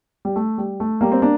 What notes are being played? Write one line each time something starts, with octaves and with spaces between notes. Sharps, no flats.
G3
A3
G3
A3
G3 A#3
C4
A#3 D4